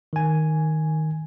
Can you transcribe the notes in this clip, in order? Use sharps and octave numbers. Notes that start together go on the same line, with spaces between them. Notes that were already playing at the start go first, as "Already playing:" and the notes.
D#3 G#5